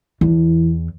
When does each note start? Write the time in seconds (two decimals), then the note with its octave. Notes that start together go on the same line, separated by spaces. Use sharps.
0.21 E2 E3